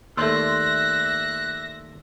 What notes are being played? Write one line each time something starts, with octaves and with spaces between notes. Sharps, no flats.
D#2 A3 D5 E5 C6 E6 F#6 A#6